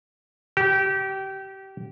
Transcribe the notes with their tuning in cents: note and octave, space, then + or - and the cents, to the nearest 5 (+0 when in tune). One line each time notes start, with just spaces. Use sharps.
G4 -25